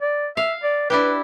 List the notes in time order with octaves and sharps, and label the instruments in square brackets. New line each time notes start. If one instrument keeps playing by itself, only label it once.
[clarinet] D5
[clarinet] E5 [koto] F5
[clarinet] D5
[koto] D4 E4 G4 [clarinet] B4